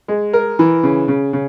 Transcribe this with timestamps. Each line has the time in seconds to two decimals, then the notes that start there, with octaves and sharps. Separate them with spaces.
0.08 G#3
0.33 A#4
0.59 E3
0.83 C#3
1.08 C#3
1.33 C#3